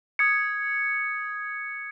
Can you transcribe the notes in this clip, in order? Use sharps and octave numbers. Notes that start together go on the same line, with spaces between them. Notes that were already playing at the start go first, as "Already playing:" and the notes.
D#6 G#6 C#7